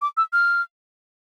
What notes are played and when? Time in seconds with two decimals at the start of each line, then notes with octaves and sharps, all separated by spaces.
0.02 D6
0.17 E6
0.33 F6